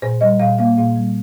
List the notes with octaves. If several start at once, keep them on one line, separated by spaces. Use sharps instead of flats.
A#2 C5
G3 D#5
A#2 F5
A#3 F5
A#2 F5
G3